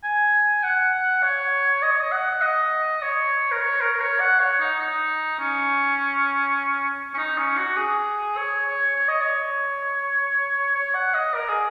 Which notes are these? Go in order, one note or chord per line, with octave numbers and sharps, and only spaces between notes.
G#5
F#5
C#5
D#5
C#5
D#5
F#5
D#5
C#5
A#4
C#5
A#4
A#4
C#5
F#5
C#5
D#4
D#4
C#4
C#4
D#4
C#4
F#4
G#4
C#5
C#5
C#5
D#5
C#5
C#5
F#5
D#5
A#4
G#4